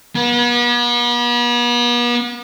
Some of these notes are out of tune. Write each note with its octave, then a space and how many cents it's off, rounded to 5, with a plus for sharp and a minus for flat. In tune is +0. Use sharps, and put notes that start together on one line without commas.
B3 -40